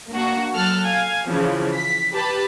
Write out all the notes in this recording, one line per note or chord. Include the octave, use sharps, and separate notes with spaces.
A#3 D4 F#4
F#3 A4 A5 F6 F#6
F5 G#5
C#3 E3 F3
B6
G4 B4 A5 B5